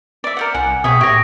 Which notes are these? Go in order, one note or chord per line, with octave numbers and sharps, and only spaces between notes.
D5 E5
A#4 C5 F#5
C2 F#5 G#5
B2 G#4 C#5 E5 G5 C#6 D#6
A2 G4 C#5 E5 C#6 A#6